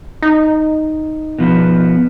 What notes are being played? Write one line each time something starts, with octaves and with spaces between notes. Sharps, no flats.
D#4
B2 F3 B3